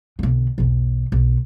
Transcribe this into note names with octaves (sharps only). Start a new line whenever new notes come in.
B1 D3
B1 E2
B1